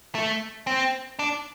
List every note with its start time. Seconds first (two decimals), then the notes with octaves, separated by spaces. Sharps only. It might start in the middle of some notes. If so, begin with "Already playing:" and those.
0.15 A3
0.67 C4
1.19 D4